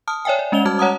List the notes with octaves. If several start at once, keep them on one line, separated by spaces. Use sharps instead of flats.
A5 D#6 F6
C#5 D5 E5 G5 G#5
D5
G#3 C#4 D#5 F7 G7
G3 F#4 A5 D6 F6 G#6
C#5 F#5 A5 A#5 D#6